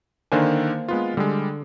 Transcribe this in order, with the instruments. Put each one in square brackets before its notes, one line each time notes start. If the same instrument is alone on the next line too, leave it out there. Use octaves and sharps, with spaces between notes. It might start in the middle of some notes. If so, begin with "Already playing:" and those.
[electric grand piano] D3 D#3 D4 [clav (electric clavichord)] A#3 C5 G#5
[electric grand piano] G#3 B3 F4
[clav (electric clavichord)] D3 [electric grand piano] G3 G#3